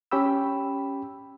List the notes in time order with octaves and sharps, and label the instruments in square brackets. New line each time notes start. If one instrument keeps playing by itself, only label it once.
[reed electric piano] C#4 G4 G5 B5 E6